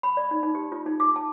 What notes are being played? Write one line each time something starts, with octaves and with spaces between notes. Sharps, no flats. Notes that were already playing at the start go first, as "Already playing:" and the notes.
B5
D5
D#4
D#4
G4
F4
D#4
D6
A5